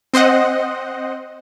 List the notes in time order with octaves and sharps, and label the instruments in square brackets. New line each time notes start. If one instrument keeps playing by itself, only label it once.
[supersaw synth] C4 C5 D#5 F#5